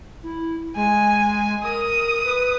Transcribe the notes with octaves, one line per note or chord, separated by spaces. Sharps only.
E4
G#3 G#5
A#4 D#6
B4